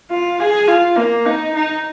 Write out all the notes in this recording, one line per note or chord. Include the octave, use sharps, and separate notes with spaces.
F4
G#4
F4
A#3
D#4
D#4